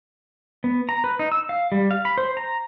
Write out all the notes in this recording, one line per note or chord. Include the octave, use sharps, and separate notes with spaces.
B3
A#5
B4
D#4
E6
F5
G3
F5
B5
C5
A#5